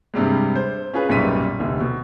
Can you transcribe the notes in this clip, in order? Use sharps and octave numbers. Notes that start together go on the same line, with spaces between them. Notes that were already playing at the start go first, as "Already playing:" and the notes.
G2 C3 G3 G#3
C5
C#4 F4 G#4 B4
B1 F#2 A#2 G3 B6 D#7
F1 D2
B2